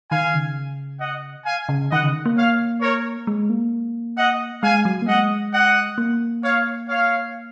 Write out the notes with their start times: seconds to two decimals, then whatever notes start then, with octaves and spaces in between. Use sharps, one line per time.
0.11 D#3 F5 G#5
0.34 C#3
1.01 D#5 F#5
1.46 F5 G#5
1.69 C#3
1.92 D#3 D#5 F#5
2.03 C#3
2.26 A#3
2.37 C#5 F5
2.81 A#4 C#5
3.27 G#3
3.50 A#3
4.18 D#5 F#5
4.62 G#3 F5 G#5
4.85 F#3
5.02 A#3
5.08 G#3 D#5 F#5
5.54 D#5 F#5
5.98 A#3
6.44 C#5 F5
6.88 C#5 F5